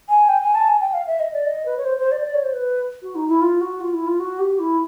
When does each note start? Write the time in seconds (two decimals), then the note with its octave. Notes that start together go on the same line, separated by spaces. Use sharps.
0.09 G#5
0.29 G5
0.42 G#5
0.55 A5
0.68 G#5
0.81 G5
0.94 F5
1.07 E5
1.20 D#5
1.33 D5
1.46 D#5
1.66 B4
1.77 C#5
1.85 C5
1.99 C5
2.12 D5
2.25 D5
2.34 C#5
2.44 C5
2.53 B4
3.02 F#4
3.15 D#4
3.28 E4
3.41 F4
3.61 F#4
3.81 F4
3.93 E4
4.07 F4
4.20 F#4
4.39 G4
4.59 E4